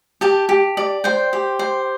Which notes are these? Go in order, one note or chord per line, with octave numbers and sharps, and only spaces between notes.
G4 A5
G4
D5
C5 G5
G4
C5